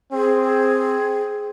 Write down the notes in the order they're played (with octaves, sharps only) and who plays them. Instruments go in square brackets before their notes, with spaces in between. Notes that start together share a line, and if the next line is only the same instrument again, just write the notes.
[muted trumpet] C4 [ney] G#4